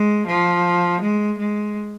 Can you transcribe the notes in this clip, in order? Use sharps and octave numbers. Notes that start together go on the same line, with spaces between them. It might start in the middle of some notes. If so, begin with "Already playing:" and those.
Already playing: G#3
F3
G#3
G#3